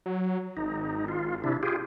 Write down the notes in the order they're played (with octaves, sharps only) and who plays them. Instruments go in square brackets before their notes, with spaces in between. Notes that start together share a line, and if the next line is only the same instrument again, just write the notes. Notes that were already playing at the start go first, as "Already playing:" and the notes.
[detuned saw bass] F#3
[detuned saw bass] G#1 [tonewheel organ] D#4
[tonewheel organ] F4
C3 D4 E4
F4 G4 G#4